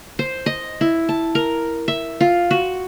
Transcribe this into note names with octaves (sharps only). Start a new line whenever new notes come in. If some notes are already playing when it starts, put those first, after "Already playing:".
C5
D#5
E4
A5
A#4
E5
F4
F#4